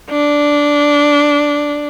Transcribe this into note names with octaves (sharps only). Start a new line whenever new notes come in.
D4